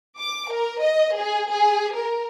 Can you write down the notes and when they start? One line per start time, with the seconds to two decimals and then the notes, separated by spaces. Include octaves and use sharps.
0.18 D6
0.51 A#4
0.81 D#5
1.16 G#4
1.48 G#4
1.95 A#4